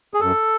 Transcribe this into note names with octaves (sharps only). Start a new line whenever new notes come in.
G#4
F#2 A4